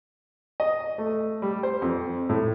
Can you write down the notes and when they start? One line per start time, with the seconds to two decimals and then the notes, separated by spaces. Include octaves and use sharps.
0.60 D#5
0.98 A3
1.42 G3
1.63 C5
1.82 F2
2.29 A2